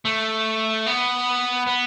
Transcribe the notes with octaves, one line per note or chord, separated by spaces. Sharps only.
A3
B3
B3